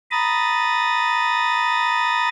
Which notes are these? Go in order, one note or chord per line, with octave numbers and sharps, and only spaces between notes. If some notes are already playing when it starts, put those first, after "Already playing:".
A#5 B5 D#6 A6